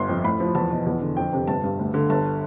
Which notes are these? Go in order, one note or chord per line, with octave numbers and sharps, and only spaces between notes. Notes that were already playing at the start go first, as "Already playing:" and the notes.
Already playing: G1 G2 C6
F2
A2 B5
F3
E2 A5
B2
E2
D3
F2 G5
C3
G1 A5
G2
D2
D3
G1 A5